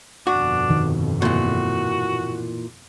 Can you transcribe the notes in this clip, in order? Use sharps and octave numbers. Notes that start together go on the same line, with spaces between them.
G1 F2 B2 D4 F#4
D#3
A#2 E3 F#4